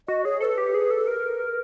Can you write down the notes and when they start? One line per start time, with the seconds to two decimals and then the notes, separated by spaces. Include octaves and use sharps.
0.08 F#4 D#5
0.25 G#4 C#5
0.41 A4 C5
0.45 B4
0.58 G4
0.74 G#4
0.91 A4
1.07 A#4